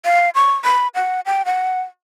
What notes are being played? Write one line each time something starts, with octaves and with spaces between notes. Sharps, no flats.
F5
C#6
B5
F#5
G5
F#5